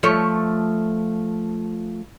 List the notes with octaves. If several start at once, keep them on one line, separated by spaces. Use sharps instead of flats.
F3 A3 C#5